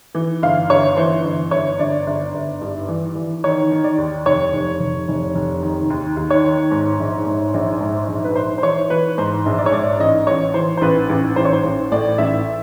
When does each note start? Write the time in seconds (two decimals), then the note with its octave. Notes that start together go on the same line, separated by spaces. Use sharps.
0.15 E3
0.43 G1 F5
0.70 G1 C#5
0.97 E3 C5
1.25 G1
1.51 G1 C#5
1.79 G1 D5
2.07 G1
2.34 G1
2.61 G2
2.88 E3
3.16 E3
3.44 D#3 C#5
3.71 D#3
3.84 D5
3.98 D#2
4.26 F1 C#5
4.53 F1
4.80 F1
5.08 F1
5.35 F1
5.62 D#3
5.90 D#2
6.17 D#2
6.30 C#5
6.44 D#3
6.71 G#2
6.99 A#1
7.27 G#2
7.54 A#1
7.81 G#2
8.08 A#1
8.24 B4
8.35 A#1 C5
8.58 C5
8.62 E3 C#5
8.90 E3 B4
9.18 G#2 C5
9.46 A#1
9.58 D5
9.66 C#5
9.72 G#2 D5
9.99 A1 D#5
10.27 A1 C#5
10.54 E3 C5
10.77 C5
10.81 A1 B4
11.09 A1
11.36 A1 C5
11.45 C#5
11.53 C5
11.64 A1
11.92 A2 D5
12.18 A1 E5